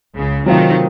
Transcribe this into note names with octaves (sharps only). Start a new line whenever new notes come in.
C#2 C#3
C3 D#3 F#3 A3 C4 F4